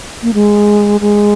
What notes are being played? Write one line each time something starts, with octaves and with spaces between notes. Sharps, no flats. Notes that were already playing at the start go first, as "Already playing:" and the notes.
A#3
G#3
G#3